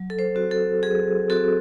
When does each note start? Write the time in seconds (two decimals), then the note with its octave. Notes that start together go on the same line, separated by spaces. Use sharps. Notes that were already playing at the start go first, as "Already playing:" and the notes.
Already playing: F#3
0.10 A4
0.19 C5
0.35 C4 F#4
0.51 A4
0.83 F#3 G#4
1.30 C4 F#4 A4